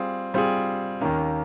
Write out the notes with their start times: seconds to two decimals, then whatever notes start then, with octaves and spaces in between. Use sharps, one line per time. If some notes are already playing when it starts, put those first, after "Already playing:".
Already playing: G3 C4 F4 G#4
0.34 G3 C4 F4 G#4
1.01 D#2 D#3 A#3 C#4